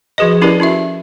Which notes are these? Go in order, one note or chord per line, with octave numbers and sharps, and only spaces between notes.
F3 F#4 G#4 B4 D#5
C#4 E4 G4 A#4 B4 D5
C#4 E4 F#4 E5